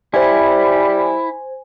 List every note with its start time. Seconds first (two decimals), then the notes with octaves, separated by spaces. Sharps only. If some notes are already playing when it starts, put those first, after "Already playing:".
0.14 G3 E4 C5 G#5